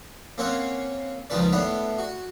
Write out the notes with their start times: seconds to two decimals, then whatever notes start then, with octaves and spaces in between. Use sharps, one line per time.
0.38 A#3 C4 C#4 C#5 F#5
1.30 C#2 D#3 F3 C#4 B4 D5
1.52 A2 B3 D4 F#5 B5
1.99 F#4